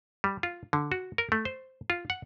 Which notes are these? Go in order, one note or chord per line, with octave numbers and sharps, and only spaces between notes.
G3
F4
D3
F#4
A#4
A3
C5
F4
F#5